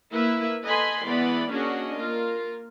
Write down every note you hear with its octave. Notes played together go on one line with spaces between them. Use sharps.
A#3 E4 B4 E5
A4 B4 D#5 G#5 B5 C6
E3 G#3 B3 D5 B5
A#3 C#4 D4 F#4 G#4 D#5
A#3 F4 A#4